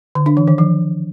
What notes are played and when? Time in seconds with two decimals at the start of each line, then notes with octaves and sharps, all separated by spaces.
0.15 D3
0.26 D4
0.37 E3
0.47 D#3
0.58 F3